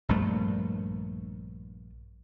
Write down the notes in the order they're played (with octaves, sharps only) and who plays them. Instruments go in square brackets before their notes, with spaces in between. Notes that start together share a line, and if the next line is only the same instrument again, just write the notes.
[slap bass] A#1 G2 A3